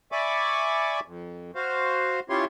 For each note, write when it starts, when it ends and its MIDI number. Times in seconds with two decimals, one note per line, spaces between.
0.12 1.00 74
0.12 1.00 76
0.12 1.00 80
0.12 1.00 83
0.12 1.00 85
0.12 1.00 86
1.05 1.51 41
1.55 2.20 66
1.55 2.20 72
1.55 2.20 77
2.30 2.45 61
2.30 2.45 64
2.30 2.45 65
2.30 2.45 67
2.30 2.45 73
2.30 2.45 84